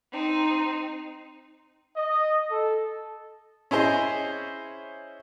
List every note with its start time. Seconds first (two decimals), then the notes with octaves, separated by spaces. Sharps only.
0.13 C4 D#4
1.96 D#5
2.49 A4
3.71 C#4 E4 G#4 C5 D#5